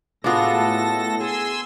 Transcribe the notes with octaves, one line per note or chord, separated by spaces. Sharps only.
A2 G#3 B3 D4 F4 F#4 A4 A#6
G#4 G#5 C6 E6